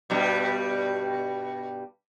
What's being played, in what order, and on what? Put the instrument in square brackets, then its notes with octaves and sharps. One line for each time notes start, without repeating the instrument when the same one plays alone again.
[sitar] G2 B2 G3